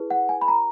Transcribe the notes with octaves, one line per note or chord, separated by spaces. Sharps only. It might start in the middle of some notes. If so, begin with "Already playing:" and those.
Already playing: E4 G#4 B4
F#5
G#5
B5
A#5